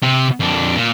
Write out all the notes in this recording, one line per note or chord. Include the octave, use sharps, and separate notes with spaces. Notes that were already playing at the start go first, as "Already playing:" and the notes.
C3
F2 D4
A#2